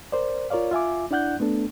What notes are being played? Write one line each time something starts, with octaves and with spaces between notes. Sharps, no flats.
A#4 C5 D5
F4 A#4 C#5 D5 F5
F4 E5 G#5 D6
D4 E4 D5 F#5 F#6 G6
A3 B3 D4 A4